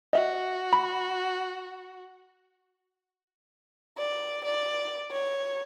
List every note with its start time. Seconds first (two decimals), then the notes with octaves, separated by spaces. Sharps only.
0.13 F#4 D#5 E5
0.73 B5
3.98 D5
4.45 D5
5.11 C#5